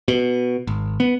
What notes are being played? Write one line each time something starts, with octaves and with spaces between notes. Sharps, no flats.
B2
G#1
B3